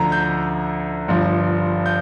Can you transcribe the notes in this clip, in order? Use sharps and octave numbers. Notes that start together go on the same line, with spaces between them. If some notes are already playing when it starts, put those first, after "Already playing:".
Already playing: D2 D3 F3 A#5
G6
G1 G2 F3
G6